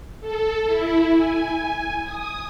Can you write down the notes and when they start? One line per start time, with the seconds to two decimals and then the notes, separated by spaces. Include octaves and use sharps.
0.21 A4
0.67 E4
1.14 G#5
2.04 D#6